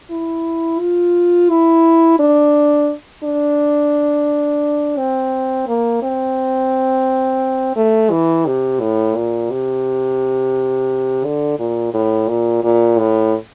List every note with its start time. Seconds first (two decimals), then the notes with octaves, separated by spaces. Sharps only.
0.11 E4
0.80 F4
1.49 E4
2.19 D4
3.23 D4
4.97 C4
5.67 A#3
6.02 C4
7.76 A3
8.11 E3
8.46 C3
8.80 A2
9.16 A#2
9.50 C3
11.24 D3
11.59 A#2
11.94 A2
12.28 A#2
12.64 A#2
12.99 A2